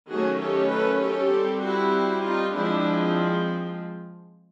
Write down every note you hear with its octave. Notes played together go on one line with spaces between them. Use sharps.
D#3 F#3 A3 C#4 F#4 G#4
G4 A4
A4 B4
G4 A4
G3 C4
E4 F#4
D#4 F4
F3 G#3 C4 D4 E4